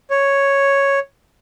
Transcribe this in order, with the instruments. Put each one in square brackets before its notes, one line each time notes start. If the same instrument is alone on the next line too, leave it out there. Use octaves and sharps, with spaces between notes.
[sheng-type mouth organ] C#5